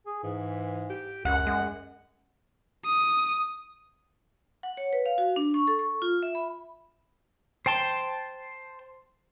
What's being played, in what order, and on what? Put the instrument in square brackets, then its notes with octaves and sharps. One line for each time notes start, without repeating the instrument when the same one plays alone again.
[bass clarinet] G#4
[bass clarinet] G#2 [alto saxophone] E3
[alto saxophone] G4
[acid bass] C#2 [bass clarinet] F#2 [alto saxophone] F#5
[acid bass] G#3
[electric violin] D#6
[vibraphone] F#5
C#5
B4
F5
F#4
D4
C#6
A4
C#6
F4
E5
B5
[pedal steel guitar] C5 G5 A5 C6